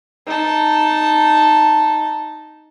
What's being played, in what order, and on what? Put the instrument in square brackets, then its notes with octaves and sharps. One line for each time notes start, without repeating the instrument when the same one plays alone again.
[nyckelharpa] D#4 A5